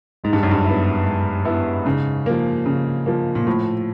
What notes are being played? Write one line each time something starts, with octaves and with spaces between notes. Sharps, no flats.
G#2 G#3
G2
F#2
G2
B3 E4
G#3
B3 E4
G#2 C#3
F3 A#3
C#3
F3 A#3
A#2
A2 F3